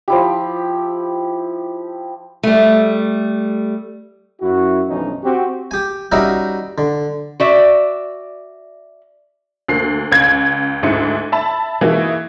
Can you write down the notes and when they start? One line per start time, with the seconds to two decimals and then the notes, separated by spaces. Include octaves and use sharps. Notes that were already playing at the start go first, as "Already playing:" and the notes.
0.08 F3 E4 G4
2.43 G3 A3
4.41 F#2 E4 F#4
4.88 B1 G2 E3 F3 C#4 D#4
5.23 C4 F#4 G4
5.71 G4 G#5
6.12 G3 C#4 D#4 F#4 A#4 E5
6.78 D3
7.40 F#4 D5 E5
9.68 D2 A#3 C7
10.11 C#2 G#6
10.83 D2 G#2 E4 C#7
11.32 E5 A5 B5
11.81 E3 A#3 D#4 E4 F#4 G#4